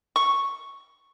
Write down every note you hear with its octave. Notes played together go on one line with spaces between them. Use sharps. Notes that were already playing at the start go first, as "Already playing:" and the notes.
C#6